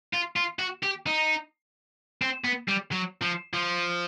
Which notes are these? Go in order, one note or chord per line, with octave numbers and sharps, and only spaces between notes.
F4
F4
F#4
G4
D#4
C4
B3
G3
F#3
F3
F3